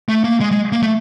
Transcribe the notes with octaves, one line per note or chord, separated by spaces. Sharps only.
A3
A#3
G#3
G#3
A#3
A3